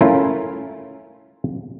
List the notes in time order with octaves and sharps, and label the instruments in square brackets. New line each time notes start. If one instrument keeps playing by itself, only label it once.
[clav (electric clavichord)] A3 C#4 E4 F4 A#4